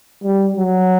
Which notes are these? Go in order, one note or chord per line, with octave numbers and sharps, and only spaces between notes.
G3
F#3